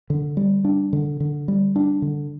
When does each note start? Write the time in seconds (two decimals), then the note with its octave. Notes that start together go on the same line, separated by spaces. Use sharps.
0.10 D3
0.37 G3
0.65 D4
0.93 D3
1.20 D3
1.48 G3
1.76 D4
2.02 D3